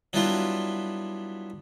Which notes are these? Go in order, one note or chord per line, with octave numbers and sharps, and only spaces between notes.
F#3 G3 B3 D4 E4 F4